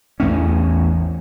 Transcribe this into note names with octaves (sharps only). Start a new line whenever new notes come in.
A1 E2 A3 C#4